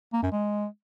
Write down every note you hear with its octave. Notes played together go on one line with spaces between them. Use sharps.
A#3
F#2
G#3